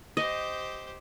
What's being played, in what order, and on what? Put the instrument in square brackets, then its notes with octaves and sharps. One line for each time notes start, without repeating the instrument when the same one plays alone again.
[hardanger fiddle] G4 C5 [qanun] D#5